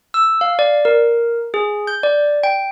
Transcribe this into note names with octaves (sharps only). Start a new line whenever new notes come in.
E6
F5
D5
A#4
G#4
G6
D5
G5